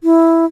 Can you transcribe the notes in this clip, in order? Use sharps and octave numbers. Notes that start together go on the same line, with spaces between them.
E4